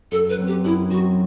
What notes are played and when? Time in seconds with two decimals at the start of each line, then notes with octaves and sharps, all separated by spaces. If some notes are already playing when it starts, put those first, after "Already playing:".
0.12 F#2 A4
0.30 B4
0.38 F#3 C4
0.47 G4
0.65 F#2 E4
0.91 F#3 C4 F#4